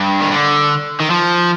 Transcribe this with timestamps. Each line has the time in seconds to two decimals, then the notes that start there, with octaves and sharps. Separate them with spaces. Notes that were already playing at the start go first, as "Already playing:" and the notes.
Already playing: G2
0.21 D#3
0.31 D3
1.00 D#3
1.10 F3